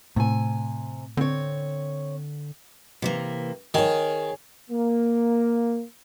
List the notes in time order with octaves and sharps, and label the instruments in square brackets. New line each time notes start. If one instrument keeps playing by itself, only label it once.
[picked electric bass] A2 [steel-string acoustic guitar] C3 G#5
[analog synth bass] D3 [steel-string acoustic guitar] C4 C#5
[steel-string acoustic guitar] C3 E3 A#3
[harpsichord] D#3 [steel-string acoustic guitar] G#4 C#5
[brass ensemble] A#3